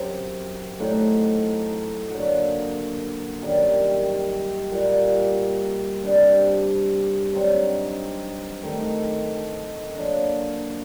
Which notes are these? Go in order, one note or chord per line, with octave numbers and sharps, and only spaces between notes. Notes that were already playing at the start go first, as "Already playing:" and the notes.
Already playing: F#2 F#3 C4 G4
A2 A3 D#4 F#4
D3 F#3 A#3 F#4
F#2 D#3 G3
A#2 G3 A#3 F#4
C3 G3 D4 G4
G2 F#3 C4 D#4
D#3 A3 D#4
F#3 A#3 D4